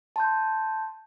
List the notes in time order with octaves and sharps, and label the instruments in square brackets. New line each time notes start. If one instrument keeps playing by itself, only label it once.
[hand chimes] A5 C6 G6